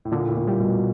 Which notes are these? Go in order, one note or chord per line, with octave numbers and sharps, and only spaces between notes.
A2
A#2 D3
A2
A#2
G3
B2